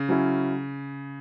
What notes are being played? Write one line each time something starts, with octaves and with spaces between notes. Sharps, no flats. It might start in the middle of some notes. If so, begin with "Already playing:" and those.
Already playing: C#3
F#3 C#4 E4